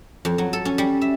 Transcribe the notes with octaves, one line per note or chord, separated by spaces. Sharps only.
F2
F#3
A4
C#4
G3
E5